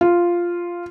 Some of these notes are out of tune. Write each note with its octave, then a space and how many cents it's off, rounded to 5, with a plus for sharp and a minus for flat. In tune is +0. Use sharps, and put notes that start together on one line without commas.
F4 -5